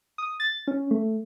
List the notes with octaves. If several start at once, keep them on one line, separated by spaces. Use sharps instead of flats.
D#6
A6
C#4
A3